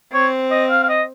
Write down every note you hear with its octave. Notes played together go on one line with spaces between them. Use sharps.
C4 C#5
D#5
F5
F5
D#5